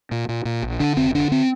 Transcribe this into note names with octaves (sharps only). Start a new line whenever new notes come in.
A#2
A#2
A#2
A#1
D3 D4
F1 C4
D3 D4
C4